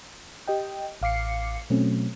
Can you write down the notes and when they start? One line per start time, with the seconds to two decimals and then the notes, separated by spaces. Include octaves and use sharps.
0.48 G4 D#5 G5
1.02 A1 F5 D6 C7 C#7
1.70 B2 F#3 A3 C4 C#4